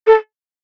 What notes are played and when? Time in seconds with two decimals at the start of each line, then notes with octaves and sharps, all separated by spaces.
0.07 A4